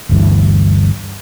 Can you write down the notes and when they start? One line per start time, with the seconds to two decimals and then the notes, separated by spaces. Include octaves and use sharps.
0.09 G1 D2 G2 E3